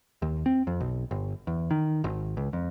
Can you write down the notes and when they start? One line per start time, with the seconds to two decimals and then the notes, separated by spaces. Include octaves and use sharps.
0.22 D#2
0.46 C4
0.67 F2
0.81 B1
1.11 G1
1.47 E2
1.71 D#3
2.04 G#1
2.37 C#2
2.53 F2